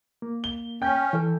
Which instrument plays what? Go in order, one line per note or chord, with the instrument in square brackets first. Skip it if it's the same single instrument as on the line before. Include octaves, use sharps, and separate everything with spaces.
[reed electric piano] A#3
[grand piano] G7
[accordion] C#4 [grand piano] G5 G6
[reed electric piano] E3 A4